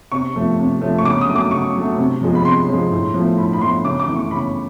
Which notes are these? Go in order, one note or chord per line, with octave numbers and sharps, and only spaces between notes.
C3 C#6
F3 A3
C3
F3 A3
C#6
C#3 D6
D#6
F#3 A3
D6
C#3 C#6
F#3 A3
C3
F3 G#3
B5
C3 C6
F3 G#3
A2
F3 A3
A2 B5
B5
F3 A3 C6
C#3 D6
D6
E3 A3
C#6
C#3 B5